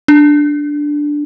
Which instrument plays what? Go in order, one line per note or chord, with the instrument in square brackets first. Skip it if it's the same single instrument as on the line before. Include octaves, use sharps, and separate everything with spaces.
[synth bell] D4